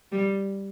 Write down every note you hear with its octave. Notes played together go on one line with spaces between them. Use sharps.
G3